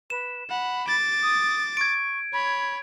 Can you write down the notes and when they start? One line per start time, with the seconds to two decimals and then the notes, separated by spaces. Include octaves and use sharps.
0.10 B4 E7
0.50 F#5 B5
0.88 D6 A6
1.22 D#6
1.77 C#6 G#6 D7
2.33 C#5 B5